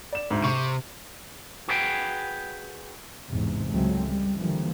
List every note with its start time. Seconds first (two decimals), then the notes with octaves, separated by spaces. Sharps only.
0.13 D5 E7
0.31 D2 G#2
0.44 C3 C#6
1.68 F#4 G#4 B4 G5
3.28 A1 E2 G#2 C3
3.70 C#2 F#3 G#3 A3 C4
4.07 G3
4.36 D3 E3 F3 G3 A#3